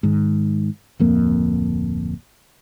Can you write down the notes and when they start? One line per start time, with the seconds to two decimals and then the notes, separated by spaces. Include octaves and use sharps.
0.03 G#2 D#3
1.00 D1 F2 A#3